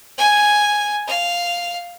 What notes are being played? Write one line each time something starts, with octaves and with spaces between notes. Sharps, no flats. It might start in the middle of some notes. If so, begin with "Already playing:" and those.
G#5
F5